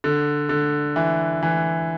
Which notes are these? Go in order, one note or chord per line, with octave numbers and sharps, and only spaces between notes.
D3
D3
E3
E3